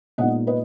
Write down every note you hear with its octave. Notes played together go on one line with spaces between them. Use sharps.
A#2 G#3 B3 D#4 D#5 F#5
B4 D#5